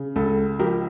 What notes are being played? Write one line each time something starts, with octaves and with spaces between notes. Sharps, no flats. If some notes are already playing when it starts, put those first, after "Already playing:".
Already playing: C#3
C#2 A4
F3 G4 A#4